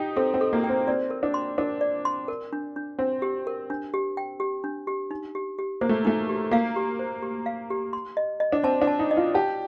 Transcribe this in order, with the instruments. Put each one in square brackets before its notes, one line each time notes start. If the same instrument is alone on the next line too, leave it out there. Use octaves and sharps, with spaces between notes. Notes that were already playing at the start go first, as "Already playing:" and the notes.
Already playing: [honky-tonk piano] D#4 G4 [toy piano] G5
[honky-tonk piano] C4 [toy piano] A4
[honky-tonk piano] C4
[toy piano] A4
[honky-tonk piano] A#3
[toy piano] G5
[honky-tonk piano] C4
[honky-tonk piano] C4 [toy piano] D5
[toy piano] A#4
[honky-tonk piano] D4
[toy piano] C6
[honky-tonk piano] D4 [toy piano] A#4
[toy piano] D5
C6
A#4
D4
D4
[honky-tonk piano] C4 [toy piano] D4
[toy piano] G4
A#4
D4
G4
G5
G4
D4
G4
D#4
G4
G4
[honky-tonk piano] A#3 [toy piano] C5
[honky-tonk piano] A3
[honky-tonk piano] A3 [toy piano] D#4
[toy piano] G4
[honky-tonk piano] A#3 [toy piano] F5
[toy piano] G4
C5
G4
F5
G4
C6
D#5
D#5
[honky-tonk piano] D4
[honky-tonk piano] C4 [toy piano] A5
[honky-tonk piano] D4
[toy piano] A5
[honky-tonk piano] D#4
[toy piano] D#5
[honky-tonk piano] F4
[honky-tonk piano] G4 [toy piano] A5